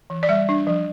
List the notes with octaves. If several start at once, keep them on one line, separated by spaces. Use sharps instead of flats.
E3
D5
G3 E5
D4
F3